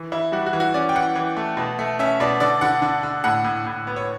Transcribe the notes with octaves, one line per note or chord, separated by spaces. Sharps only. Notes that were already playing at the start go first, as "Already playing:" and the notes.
Already playing: E3
E3 E4
G3 F#4
F#4
E3
F#4
C#4 D5
G5
E3 F#5
E3
A3
B2
A3
C#4 E5
B2 D5
D3 D5
D3 F#5
D3
D3
A2 F#5
A2
A2
B3
C#5